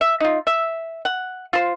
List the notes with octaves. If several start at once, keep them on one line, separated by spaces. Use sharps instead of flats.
E5
D#4 F4
E5
F#5
F4 C5